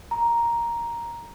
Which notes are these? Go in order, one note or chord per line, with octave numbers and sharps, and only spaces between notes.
A#5